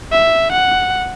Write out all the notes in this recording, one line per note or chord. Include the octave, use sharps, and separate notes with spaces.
E5
F#5